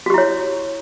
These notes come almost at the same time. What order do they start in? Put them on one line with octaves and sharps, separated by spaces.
F#4 G4 E4 C#5